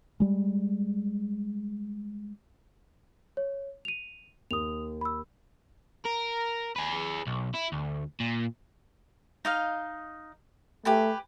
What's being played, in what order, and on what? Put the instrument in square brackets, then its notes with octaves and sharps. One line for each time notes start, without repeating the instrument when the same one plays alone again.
[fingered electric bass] G3 G#3
[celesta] C#5
D#7 F7
[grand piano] D#2 [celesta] D#6 F7
[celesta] B5 E6
[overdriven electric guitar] A#4
G#4 B4
B1
E4
D2
A#2
[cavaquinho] D#4 D#5 F5
[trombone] A3 [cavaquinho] G4 B4 G#5